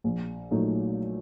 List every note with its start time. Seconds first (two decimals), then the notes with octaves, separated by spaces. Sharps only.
0.04 A#1
0.51 A#2 F#3 A3 D#4